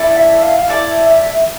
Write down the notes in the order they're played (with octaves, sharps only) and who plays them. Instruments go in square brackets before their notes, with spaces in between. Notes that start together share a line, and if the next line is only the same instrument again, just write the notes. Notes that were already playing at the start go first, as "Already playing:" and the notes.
Already playing: [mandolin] E4 A4 D5
[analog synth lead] E5
F5
F5
[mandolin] E4 A4 D5
[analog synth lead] E5